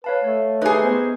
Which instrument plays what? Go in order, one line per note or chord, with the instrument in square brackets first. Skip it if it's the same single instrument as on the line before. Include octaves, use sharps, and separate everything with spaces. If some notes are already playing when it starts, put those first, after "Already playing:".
[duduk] B4 [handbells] C#5 F5 A5
[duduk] A3 [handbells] C#5
[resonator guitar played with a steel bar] D#4 G#4 [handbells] G4 B4
[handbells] B3 [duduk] C5